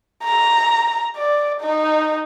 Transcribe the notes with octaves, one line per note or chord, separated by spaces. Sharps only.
A#5
D5
D#4